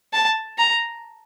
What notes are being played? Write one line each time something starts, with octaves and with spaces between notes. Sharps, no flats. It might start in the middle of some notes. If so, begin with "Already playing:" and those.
A5
A#5